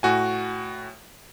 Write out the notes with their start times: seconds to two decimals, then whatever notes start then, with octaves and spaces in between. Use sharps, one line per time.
0.03 A2 F#4 G#5